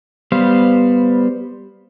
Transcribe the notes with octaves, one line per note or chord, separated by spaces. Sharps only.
G3 B3 C5 F5